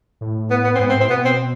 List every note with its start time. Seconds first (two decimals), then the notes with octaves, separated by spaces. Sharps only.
0.21 A2
0.51 B3
0.64 B3
0.75 C4
0.79 G#2 B3
0.89 C4
0.94 A2
1.00 C4
1.09 B2 B3
1.25 C4